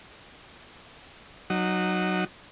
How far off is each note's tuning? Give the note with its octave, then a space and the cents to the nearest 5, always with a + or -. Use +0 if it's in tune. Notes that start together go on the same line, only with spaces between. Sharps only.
F#3 +0 D#4 -20